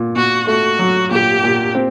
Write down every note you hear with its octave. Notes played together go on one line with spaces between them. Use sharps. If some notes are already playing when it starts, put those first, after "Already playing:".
Already playing: A#2
A#2 F#4
A3 F#4
F#3
A#2 G4
A#2
C4